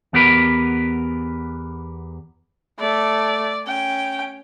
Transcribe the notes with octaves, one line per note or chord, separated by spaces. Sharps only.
E2 B3 G4 A#4 B4
A3 D5
C#4 G5